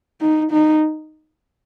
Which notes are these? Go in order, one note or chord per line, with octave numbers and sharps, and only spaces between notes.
D#4
D#4